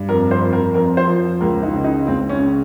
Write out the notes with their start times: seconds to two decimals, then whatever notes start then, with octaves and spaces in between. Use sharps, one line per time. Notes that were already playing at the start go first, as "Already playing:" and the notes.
Already playing: G2
0.09 F2 A#4
0.31 C5
0.42 F2
0.53 A#4
0.74 F2 A#4
0.97 C5
1.08 F3
1.41 C#2 A#4
1.63 D#4
1.73 C#3
1.84 D#4
2.07 C#2 C4
2.29 C#4
2.39 C#3